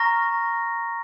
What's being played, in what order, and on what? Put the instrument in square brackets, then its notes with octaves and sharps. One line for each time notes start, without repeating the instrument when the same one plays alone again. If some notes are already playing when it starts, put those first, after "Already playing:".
Already playing: [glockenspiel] A#5 C#6 F6 A#6